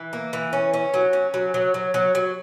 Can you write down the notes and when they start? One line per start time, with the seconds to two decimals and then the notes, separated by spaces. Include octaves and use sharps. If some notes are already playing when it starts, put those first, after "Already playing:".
Already playing: E3
0.13 A#3
0.33 E3
0.53 C#4
0.74 C#4
0.94 F#3
1.13 C#4
1.34 F#3
1.54 F#3
1.74 F#3
1.94 F#3
2.15 F#3